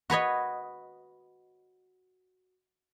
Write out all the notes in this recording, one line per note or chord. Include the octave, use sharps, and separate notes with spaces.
F#4 B4 C#5 D#5